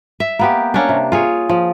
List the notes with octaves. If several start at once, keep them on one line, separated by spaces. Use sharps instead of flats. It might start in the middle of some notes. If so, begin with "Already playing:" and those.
E5
A#3 B3 G4
A#3 C#4 D4
C3
F4 G#4 C#5
F3